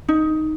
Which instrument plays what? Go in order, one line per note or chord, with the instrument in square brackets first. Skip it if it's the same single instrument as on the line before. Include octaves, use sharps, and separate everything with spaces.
[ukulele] D#4